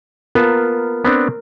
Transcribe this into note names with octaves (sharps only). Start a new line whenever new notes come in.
B3 F4 A#4 A5
B3 C4 D4